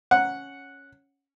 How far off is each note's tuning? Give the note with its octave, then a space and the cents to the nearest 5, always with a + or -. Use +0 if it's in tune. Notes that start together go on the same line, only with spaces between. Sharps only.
C#4 +0 F#5 -5